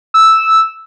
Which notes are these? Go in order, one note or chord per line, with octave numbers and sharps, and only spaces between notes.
E6